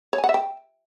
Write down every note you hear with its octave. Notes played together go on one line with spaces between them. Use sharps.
C#5
G#5
F#5
E5
G5